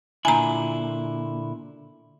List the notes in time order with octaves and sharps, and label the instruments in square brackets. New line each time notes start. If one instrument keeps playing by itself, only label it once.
[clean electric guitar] A#2 D3 E4 [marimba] G#5 A#5